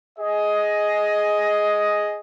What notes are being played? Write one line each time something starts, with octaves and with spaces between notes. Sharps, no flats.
G#4 D#5